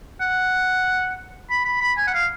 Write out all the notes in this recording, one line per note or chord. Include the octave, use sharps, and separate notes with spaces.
F#5
B5
B5
B5
G#5
F#5
F5